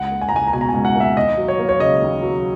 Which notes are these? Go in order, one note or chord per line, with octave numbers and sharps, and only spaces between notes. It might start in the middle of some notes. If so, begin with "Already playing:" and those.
Already playing: C#2 F#5
A#3
G#5
A#5
C#2 G#5
A#5
B2 G#5
A#5
C#2 G#5
F#5
A#3 E5
D#2 D#5
F#3
C#5
A#3
C#5
C#3 D#5
D#2
F#3